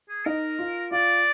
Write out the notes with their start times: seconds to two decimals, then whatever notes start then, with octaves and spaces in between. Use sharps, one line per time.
0.09 G#4
0.26 D#4 A#4 D#5
0.59 F4 F5
0.91 F4 D5 F5